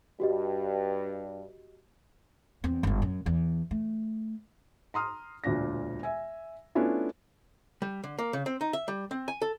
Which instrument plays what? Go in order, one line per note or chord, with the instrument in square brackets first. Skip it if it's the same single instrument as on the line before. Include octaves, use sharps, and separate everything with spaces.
[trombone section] G2 [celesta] F#4 G4 D#5
[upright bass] E2 C4
G1 G#2
F#2
E2
A3
[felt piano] A#5 C6 D#6 F6
E1 D2 A#2 D4 A#6
E5 G#5
A3 B3 C#4 D4 E4 F4
[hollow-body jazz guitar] G3
D3
A#3
C#3
C4
D#4
E5
G3
C4
G#5
A4